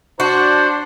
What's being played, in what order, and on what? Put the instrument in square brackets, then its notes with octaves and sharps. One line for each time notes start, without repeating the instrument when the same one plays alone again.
[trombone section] D4 [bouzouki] F#4 [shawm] C5